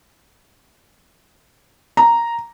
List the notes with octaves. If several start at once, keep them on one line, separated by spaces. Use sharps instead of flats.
A#5